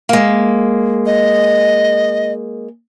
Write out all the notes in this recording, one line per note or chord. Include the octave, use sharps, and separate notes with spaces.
G#3 A#3
D#5